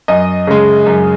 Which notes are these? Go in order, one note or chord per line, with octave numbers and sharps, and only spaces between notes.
F#2 D#5
C#3 G#3
F#2